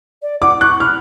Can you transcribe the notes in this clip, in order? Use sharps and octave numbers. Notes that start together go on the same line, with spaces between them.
D5
F#5 D6
D6
C#6 F#6
B5 F6